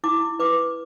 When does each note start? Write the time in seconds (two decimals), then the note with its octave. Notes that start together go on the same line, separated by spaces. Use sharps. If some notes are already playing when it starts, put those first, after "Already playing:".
0.04 E4 D6
0.39 B4 D6